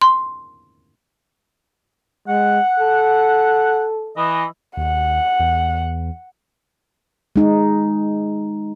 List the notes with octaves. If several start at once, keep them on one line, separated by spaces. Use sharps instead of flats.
C6
G#3 F#5
A4
E3 D#5
D#2 F#5
E2
G#3 D#4